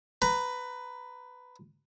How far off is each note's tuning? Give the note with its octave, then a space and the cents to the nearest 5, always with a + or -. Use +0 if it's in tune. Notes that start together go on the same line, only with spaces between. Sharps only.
B4 +15 A#5 +0